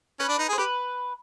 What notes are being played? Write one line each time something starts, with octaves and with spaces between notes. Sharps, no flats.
C#4 B4
D4
D#4
G#4
C5
G4 B4